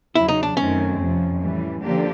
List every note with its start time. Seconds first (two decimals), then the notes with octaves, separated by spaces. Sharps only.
0.15 E2 C#3 F#3 E4
0.28 D#4
0.43 D4
0.57 F#2 D#3 F#3 A3 C4 C#4
0.99 F2 C3 F3
1.41 A2 E3 G3
1.82 D3 F3 A#3 D4 G4